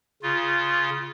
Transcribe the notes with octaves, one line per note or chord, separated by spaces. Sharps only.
C#3 F4